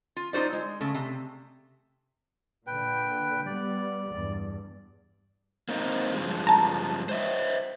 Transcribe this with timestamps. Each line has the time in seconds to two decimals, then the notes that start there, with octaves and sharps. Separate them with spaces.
0.16 F4
0.33 D#4 F4 F#4 C5 D5
0.53 G#3
0.81 C#3 A3
0.95 C3
2.67 A#2 D3 B4 G5
3.46 G3 B3 D5
4.09 E2 G2
5.69 A#3 C4 D#4
6.15 G2 F3 G#3
6.47 A5 A#5
7.09 C5 D#5 E5